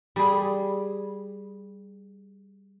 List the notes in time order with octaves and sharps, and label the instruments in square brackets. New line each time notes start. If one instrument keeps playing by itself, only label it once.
[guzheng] G3 G#4